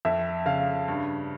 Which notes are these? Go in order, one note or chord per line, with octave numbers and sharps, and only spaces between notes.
F2 E5
C#3 F5
G2